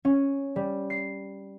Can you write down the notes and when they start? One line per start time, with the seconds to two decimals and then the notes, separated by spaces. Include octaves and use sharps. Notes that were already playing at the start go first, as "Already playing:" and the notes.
0.05 C#4
0.56 G3
0.90 C7